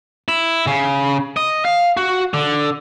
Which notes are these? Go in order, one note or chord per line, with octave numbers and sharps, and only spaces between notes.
E4
C#3
D#5
F5
F#4
D3